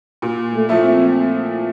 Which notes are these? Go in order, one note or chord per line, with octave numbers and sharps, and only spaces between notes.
A#2
A3
F3 A3 E4
C4